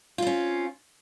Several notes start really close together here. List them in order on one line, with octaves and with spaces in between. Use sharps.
F4 C4 C#4